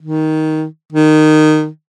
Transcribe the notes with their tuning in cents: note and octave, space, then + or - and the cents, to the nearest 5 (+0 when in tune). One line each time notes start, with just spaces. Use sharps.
D#3 +10
D#3 -15